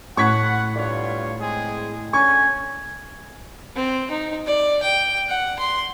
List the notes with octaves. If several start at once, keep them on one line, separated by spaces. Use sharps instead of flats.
A2 A3 F#5 C#6 G#6 B6
G2 F4 C#5 D5
G#3 C4 G#4
D3 C#4 G#5 C#6
C4
D#4
D5
G5
F#5
C6